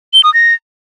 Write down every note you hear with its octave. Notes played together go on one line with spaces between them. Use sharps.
G7
D#6
A#6